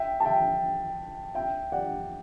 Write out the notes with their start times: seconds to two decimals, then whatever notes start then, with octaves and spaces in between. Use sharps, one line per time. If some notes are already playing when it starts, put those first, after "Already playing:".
Already playing: E5 G5
0.20 A5
0.25 E5 G5
1.35 E5 G5
1.72 D5 F#5